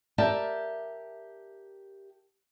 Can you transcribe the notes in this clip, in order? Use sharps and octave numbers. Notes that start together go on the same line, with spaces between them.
G4 A#4 D5 E5 A5